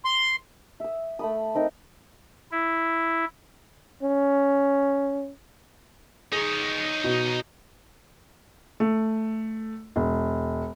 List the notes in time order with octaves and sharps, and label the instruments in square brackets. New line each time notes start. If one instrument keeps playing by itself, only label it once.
[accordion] C6
[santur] E5 D#6
A3 B5 D#6
C4 D#4 A#4
[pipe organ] E4
[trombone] C#4
[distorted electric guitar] D#4 C#5 [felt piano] G#4
[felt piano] B2
A3
E1